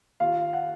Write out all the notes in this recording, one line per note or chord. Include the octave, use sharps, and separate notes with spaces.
D#2 F4 F5
F#5